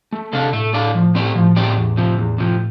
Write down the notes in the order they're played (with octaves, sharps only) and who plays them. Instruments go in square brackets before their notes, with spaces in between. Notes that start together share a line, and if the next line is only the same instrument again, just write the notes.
[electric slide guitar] A3
[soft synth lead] C3 [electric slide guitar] D4 A4 D5 F5
[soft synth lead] A2 [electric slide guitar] A3
[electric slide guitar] D4 A4 D5 F5
F3
A3 C4 G4 D5
[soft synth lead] A2 [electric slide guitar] F3
[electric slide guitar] A3 C4 G4 D5
E2
C3 F3
E2
C3 F3